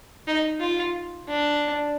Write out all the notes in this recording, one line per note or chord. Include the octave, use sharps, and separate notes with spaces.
D#4
F4
D4